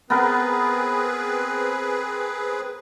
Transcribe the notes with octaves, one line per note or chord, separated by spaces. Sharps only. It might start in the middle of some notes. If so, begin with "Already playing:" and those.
B3 C4 G#4 A#4 B4